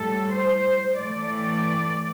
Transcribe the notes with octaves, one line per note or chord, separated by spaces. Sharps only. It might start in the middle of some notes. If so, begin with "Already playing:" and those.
Already playing: A2 G3 A4
C5
A2 E3 A3 D5